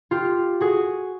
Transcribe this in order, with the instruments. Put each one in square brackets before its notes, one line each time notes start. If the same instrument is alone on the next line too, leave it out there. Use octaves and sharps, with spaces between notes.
[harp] F4 G4
F#4 G#4